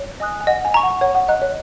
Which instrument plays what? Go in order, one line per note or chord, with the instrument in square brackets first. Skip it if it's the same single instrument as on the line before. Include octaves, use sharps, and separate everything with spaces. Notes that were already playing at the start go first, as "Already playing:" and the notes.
Already playing: [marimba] C#5
[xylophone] D#5 G#5 D#6 F#6
[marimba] G#5
[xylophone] D#5 [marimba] F#5
[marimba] G#5
[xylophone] A#5 C#6
[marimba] F#5
[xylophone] C#5 [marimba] F#5
[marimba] F#5
[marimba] D#5 [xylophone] A#5 F#6
[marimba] C#5